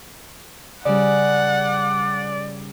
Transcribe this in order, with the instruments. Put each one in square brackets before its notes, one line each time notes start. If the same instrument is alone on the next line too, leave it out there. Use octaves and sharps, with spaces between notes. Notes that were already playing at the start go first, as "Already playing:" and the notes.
[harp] C#3 G3 [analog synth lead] D5 [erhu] F#5